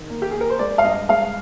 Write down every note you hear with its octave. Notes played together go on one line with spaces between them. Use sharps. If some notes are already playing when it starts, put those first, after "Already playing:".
Already playing: D#3
A#3
G4
A#3 G#4
A#4
C5
G#3 D5
F5
G2 D#5
G#3 F5